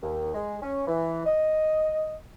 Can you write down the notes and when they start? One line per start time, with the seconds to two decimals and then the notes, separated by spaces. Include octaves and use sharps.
0.03 D#2
0.34 G#3
0.62 C#4
0.87 E3
1.25 D#5